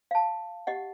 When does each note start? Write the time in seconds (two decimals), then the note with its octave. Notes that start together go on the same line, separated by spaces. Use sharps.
0.11 F5 A5
0.67 G4 D#5 F#5